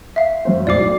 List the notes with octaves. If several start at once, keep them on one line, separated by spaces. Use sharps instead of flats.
E5 F5
F#2 C5
B1 A2 D5 D6 C7